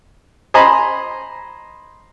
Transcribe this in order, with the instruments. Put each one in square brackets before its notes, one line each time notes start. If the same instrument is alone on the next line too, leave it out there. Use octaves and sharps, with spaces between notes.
[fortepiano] C5 D#5 G#5 A#5 B5